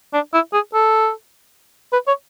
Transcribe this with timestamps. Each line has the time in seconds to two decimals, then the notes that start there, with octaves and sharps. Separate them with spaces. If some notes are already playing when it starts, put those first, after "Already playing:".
0.14 D4
0.34 E4
0.53 G#4
0.74 A4
1.93 B4
2.08 C#5